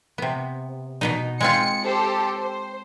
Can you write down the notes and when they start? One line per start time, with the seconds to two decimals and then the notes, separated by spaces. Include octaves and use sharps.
0.18 C3 B3
1.01 B2 B3 D#4
1.41 G#3 C4 F4 C#7
1.83 G4 A4 C5
2.39 C5